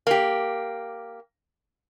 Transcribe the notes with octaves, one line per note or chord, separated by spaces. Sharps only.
A#3 G4